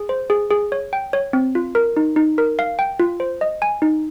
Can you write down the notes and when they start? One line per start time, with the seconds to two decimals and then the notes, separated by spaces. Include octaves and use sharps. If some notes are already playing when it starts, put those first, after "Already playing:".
Already playing: G#4
0.09 C5
0.30 G#4
0.50 G#4
0.72 C#5
0.93 G5
1.13 C#5
1.33 C4
1.55 F4
1.75 A#4
1.97 D#4
2.16 D#4
2.38 A#4
2.59 F5
2.79 G5
3.00 F4
3.20 C5
3.41 D#5
3.62 G#5
3.82 D#4